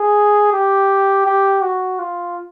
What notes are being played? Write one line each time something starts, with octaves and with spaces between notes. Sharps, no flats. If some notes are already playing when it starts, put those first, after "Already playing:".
Already playing: G#4
G4
G4
F#4
F4